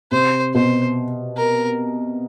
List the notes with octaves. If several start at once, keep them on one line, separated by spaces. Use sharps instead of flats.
C3 C5
B2 C5
A#4